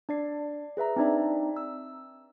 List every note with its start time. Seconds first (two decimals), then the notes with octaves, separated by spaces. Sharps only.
0.09 D4 D5 C7
0.77 G#4 B4 E5 A#5
0.96 C4 D4 D#4 D5 E5
1.56 E6